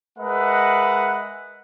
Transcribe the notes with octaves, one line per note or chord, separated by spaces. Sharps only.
G#3 A#4 B4 D#5 E5 F#5